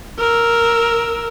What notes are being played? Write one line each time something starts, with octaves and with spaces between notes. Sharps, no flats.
A#4 E6